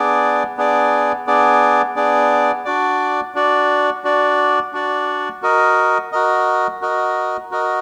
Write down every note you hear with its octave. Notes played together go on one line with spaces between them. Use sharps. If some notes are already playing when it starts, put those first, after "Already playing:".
Already playing: B3 D4 G#4 D5
B3 D4 G#4 D5
B3 D4 G#4 D5
B3 D4 G#4 D5
D4 F#4 D5
D4 F#4 D5
D4 F#4 D5
D4 F#4 D5
F#4 A#4 D#5
F#4 A#4 D#5
F#4 A#4 D#5
F#4 A#4 D#5